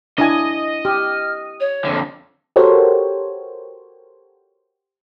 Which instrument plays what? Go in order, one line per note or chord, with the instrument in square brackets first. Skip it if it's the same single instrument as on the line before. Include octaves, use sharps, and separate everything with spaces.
[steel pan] D4 E4 G#5 [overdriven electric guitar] D#5
[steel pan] G4 [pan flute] F6
[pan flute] C#5
[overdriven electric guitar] F2 D3
[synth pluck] F#4 G4 A4 A#4 C5 C#5